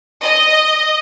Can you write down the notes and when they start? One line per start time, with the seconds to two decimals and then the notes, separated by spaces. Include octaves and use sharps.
0.23 D#5